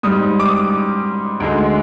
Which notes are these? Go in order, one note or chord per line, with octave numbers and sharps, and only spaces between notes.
G#2 G3 D#6
D6
D#6
D2 D3 G#3